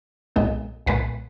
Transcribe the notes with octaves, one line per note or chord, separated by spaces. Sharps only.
B1 A#2 G#3 B3 D#5
B1 A#2 G#3 B3 B4